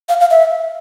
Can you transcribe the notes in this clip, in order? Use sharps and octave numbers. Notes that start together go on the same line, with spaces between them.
F5
F5
E5